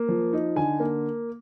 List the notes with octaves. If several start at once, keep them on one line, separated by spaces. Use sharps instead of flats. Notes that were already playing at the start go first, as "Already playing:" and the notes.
Already playing: A#3
F3
D#4
D3 G#5
A#3